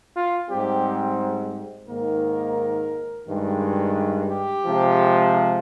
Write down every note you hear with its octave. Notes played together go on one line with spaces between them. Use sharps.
F4
G#2 G3 C4 G4
G#2 D#3 A#3 A#4
G2 D#3 G#3
G4
C3 F3 G#3